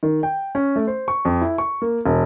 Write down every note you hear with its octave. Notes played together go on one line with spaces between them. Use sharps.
D#3
G5
C#4
A3
C5
C#6
F2
E4
C#6
A#3
E1